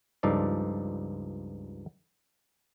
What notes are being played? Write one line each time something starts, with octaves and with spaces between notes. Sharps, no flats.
C#2 G2 F3 D#4 A4 D5